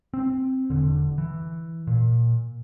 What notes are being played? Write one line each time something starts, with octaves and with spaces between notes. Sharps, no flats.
C4
E1 D3
E3
A#2